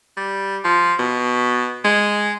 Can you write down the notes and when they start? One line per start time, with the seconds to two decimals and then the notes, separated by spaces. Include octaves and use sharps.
0.17 G3
0.64 F3
0.99 B2
1.84 G#3